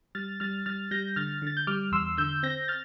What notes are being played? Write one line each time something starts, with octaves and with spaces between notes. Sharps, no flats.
G3 F6 A6
G3 F6 A6
G3 F6 A6
G3 G6 A#6
D3 F6 A6
D3 A6
G6
G3 D6 F6
E2 C6 E6
D3 E6 G6
C4 G6 A#6
F6 A6